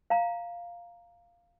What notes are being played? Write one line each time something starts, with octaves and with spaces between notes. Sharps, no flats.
F5 A#5